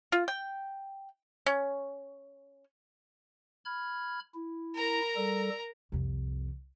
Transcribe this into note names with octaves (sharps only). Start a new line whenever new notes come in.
F4
G5
C#4
B5 F6 G#6
E4
A#4 A#5
G3 A4
C2 F2